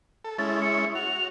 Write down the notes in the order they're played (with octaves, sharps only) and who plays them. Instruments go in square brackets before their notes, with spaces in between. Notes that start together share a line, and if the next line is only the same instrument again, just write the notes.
[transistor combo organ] A4
[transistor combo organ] G#3 C#4 E4 [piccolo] A6
[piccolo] C#7
[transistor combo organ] F#4 [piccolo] F7